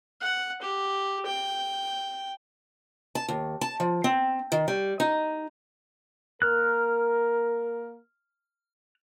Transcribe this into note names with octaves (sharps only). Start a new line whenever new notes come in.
F#5
G4
G5
A5
D#2
A5
F3
C4
D#3
G3
D#4
A#3 A#4 F6 F#6